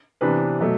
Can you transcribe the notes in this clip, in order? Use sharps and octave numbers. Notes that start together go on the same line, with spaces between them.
C3 E3 B3 D4 B4
B2 F#3 A3